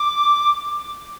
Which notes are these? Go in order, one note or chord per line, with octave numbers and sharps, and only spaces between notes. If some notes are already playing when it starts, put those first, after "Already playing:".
Already playing: D6